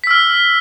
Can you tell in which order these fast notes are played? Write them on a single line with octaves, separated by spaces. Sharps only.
B6 E6 F6